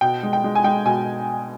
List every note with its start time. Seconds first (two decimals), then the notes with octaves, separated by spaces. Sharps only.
0.01 B2 G5
0.23 G#3
0.33 G5
0.44 G#3
0.55 G#5
0.64 G#3 G5
0.85 B2 G#5